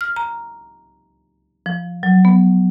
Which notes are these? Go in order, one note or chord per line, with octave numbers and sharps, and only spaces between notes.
F6
A#5
F3
F#3
B3